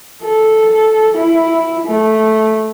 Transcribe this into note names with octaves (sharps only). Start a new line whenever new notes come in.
A4
E4
A3